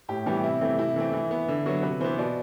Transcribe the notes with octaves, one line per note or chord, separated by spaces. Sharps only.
A2 G4
E3 G3 B3 G4
C3 E4
E3 A3 C4
C3 E4
E3 A3 C4
E3
B3
D3 E4
F#3 B3 F#4
C3 B4
E3 B3 C5
B2 D5